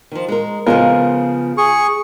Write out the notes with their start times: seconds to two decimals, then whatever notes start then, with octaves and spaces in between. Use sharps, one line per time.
0.11 D#3 F3
0.28 G#3 A#4
0.66 C#3 F3 G#3 B3 F4 A#4
1.58 G#4 C#6